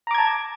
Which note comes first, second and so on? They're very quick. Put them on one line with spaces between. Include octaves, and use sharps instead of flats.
A#5 D6 G#6 A5